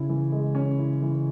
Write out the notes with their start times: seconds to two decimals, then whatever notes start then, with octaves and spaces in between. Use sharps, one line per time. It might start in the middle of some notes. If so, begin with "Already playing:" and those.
Already playing: C#3 C#4 E4
0.09 E3
0.32 G#3
0.55 C#4
0.78 E4
1.02 E3